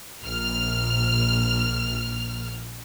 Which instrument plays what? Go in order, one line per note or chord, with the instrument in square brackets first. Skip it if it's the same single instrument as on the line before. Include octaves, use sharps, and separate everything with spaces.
[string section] A#1 F6